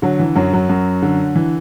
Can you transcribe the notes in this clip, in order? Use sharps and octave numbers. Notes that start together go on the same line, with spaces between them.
D3 F#3
E3
F#2 F#3
F#3
F#2
D3
E3